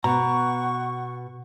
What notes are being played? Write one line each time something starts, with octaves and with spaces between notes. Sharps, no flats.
B2 F#5 A#5 C#6